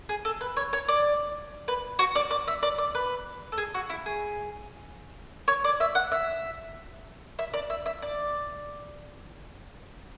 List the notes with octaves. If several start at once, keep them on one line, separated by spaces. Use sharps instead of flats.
G#4
A4
B4
C#5
C#5
D5
B4
F#4
D5
D5
E5
D5
D5
B4
A4
G#4
F#4
E4
G#4
C#5
D5
E5
F#5
E5
E5
D5
E5
E5
D5